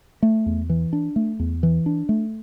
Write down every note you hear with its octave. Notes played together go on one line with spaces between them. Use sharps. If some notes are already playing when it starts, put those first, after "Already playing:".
A3
E2
E3
D4
A3
E2
E3
D4
A3